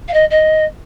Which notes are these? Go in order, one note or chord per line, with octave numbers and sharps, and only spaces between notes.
F5
D#5
D#5